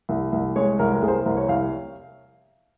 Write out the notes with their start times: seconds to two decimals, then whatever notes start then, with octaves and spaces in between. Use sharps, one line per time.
0.09 C2
0.32 C2
0.56 G#3 C#5
0.79 C2 A#4
0.94 A#4
1.02 C2 G#4
1.08 C5
1.14 A#4
1.26 C2 A#4
1.37 C#5
1.49 C2 F5